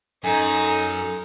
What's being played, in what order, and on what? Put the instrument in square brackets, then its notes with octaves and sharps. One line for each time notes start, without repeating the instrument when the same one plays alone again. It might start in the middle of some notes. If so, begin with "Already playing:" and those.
[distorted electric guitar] F#2 [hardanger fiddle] D#4 [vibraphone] A4 [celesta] G#5